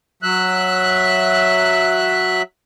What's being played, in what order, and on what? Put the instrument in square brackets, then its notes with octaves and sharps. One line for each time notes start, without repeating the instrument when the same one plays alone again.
[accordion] F#3 E5 F#6